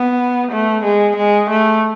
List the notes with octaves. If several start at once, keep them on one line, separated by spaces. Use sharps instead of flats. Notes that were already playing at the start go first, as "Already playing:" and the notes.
Already playing: B3
A3
G#3
G#3
A3